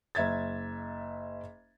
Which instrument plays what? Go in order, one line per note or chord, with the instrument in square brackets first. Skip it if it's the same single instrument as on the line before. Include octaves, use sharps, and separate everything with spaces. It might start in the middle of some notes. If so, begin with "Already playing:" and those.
[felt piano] F#1 E5 G#6 A6